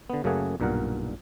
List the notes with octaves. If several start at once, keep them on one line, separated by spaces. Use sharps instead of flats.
D3 B3
F#2 C#3 A3 A#3 G#4 F#5
B1 G2 A#2 A#4 F#5